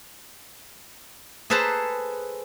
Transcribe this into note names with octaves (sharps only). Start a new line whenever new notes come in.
G#4 A4 B4 C5 A5 A#5